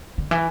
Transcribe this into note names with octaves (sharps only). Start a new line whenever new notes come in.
D3
E3